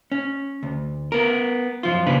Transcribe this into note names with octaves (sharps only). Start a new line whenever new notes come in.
C#4
D2
B3 A#4
F#2 F3 F4
D#2 A#2 C#3 D4 B4